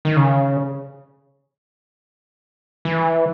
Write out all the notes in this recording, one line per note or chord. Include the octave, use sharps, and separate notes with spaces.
D#3
C#3
E3